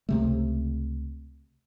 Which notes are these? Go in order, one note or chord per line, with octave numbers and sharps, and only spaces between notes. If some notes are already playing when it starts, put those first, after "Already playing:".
C#2 C3 A3